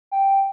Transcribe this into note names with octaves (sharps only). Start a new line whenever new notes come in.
G5